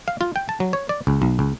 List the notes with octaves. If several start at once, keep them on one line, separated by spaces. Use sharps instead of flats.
F5
F4
G5
A5
F#3
C#5
D5
C#2
B1
C#2